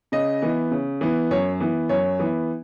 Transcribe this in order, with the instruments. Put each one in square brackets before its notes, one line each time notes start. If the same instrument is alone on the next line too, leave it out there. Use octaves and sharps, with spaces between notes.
[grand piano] C#3 D#5
E3 B3
C#3
E3 B3
F#2 C#5
E3 B3
F#2 C#5
E3 B3